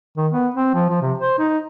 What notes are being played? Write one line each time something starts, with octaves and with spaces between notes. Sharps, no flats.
D#3
B3
C4
F3
F3
C3
C5
D#4